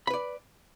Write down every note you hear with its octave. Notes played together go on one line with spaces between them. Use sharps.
B4 D5 B5